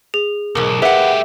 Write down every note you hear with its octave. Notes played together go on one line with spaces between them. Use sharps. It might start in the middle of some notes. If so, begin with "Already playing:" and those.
G#4
B1 E2 G#2 A#4
G#3 G4 G#4 B4 E5 F#5